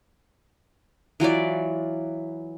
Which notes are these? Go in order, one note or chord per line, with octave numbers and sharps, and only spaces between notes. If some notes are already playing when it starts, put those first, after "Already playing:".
E3 F#3 F4 D5